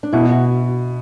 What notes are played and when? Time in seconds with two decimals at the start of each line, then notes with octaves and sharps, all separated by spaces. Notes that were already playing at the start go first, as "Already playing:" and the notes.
0.03 D4
0.13 B2 E4
0.31 F#4